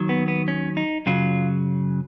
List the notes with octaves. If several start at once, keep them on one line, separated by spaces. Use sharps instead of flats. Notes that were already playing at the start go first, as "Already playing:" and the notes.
Already playing: D#2 D#3 F#3
B3
B3
C#4
D#4
F#2 C#3 F#3 F4